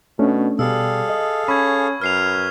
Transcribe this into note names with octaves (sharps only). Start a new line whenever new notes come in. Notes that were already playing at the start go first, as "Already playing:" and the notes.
B2 A3 C#4 D4
B2 G3 G#4 A4 F5 E6
D#5
C#4 B5 C#6 G#6
F#2 B4 F6 C7 F7